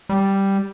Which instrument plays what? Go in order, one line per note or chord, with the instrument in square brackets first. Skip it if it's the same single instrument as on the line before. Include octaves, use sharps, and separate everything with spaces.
[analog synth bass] G3